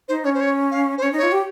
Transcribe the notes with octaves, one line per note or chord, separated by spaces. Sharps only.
D#4 C5
C#4 C#5
C5
C#5
F5
C5
C#4 C#5
D#4
C#5
F4
G4